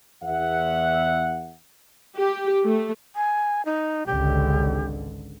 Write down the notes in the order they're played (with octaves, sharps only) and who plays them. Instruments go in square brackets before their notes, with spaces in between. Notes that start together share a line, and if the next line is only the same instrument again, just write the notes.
[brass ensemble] E2 E5 F#5
[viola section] G4
A3
[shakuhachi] G#5
D#4
[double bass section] G#1 C#2 D3 [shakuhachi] G4